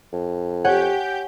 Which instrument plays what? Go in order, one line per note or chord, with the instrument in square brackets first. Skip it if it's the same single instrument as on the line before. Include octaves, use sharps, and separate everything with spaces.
[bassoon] F2
[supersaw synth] G4 G6 [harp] C#5 F#5 G#5